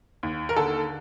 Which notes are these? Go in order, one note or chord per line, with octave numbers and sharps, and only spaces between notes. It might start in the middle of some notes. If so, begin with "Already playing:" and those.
D#2
A#4
D3 A4